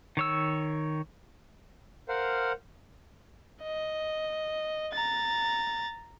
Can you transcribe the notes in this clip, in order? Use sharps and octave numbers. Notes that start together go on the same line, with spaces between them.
D#3 C#5 E6
A#4 C5 F5 F#5
D#5
A#5 A6